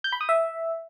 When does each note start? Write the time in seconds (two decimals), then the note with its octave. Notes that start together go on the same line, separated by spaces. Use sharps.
0.04 G6
0.12 B5
0.21 D#6
0.29 E5